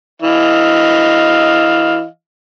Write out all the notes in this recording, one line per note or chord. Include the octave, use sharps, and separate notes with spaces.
E3 D#5 F5